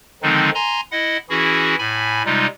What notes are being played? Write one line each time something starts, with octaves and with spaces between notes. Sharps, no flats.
D3 D#3 F3 G#3 C4 D#4
G#5 A#5 C6
E4 D#5 F#5
E3 C#4 E4 F#4 G#4
A2 G#5 B5
C3 G3 G#3 D#4 F4